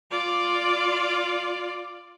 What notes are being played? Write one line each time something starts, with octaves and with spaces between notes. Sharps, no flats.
F4 D5